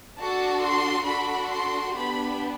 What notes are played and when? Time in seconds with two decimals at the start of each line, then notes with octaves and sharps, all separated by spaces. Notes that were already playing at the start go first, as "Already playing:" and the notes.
0.18 D4 F#4 A4 A5
0.62 C6
1.06 D4 F#4 A4 B5
1.50 C6
1.93 B3 D4 G4 B5